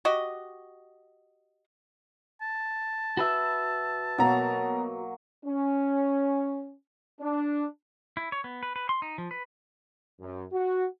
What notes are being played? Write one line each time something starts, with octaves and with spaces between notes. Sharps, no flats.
F#4 G4 D#5
A5
F#4 B4 E5
B2 F#3 A#3 A#5
C#4
D4
E4
C#5
B3
B4
B4
C6
D#4
F3
B4
F#2
F#4